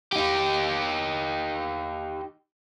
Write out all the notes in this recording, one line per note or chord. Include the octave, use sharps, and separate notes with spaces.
D#4 G4